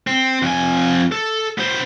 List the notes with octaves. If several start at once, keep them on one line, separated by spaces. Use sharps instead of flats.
C4
F2 G#5
A4
B3 C5